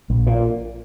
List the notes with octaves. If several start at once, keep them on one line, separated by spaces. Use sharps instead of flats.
A#1
A#2